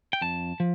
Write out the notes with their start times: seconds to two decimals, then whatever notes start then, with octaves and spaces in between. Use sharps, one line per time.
0.13 G5
0.21 F2 A5
0.60 F3